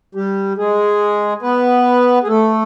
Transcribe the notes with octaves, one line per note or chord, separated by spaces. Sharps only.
G3 G4
G#3 G#4
B3 B4
G#4
A3 A4